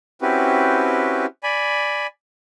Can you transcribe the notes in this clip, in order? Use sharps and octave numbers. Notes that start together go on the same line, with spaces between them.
C4 C#4 E4 F#4 G4 B4
D5 G#5 B5